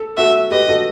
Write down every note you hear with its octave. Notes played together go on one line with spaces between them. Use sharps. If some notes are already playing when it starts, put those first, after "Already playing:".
Already playing: A4
F#4 A4 E5
G4 B4 D#5
F#4 A4